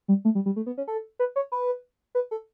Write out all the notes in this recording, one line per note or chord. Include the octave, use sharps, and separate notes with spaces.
G3
A3
G3
G3
A3
B3
C#4
A4
B4
C#5
B4
B4
A4